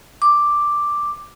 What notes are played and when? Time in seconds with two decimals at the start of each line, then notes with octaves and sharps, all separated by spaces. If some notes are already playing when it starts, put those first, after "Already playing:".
0.22 D6